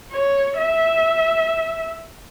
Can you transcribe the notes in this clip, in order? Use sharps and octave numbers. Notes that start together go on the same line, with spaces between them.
C#5
E5